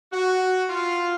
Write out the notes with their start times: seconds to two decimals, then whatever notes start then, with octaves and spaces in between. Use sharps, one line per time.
0.12 F#4
0.69 F4